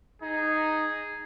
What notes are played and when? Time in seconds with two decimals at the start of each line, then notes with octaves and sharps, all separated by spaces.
0.22 D#4 G#4